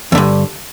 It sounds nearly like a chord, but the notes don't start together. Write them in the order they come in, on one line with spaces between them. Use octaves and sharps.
E2 D3 G2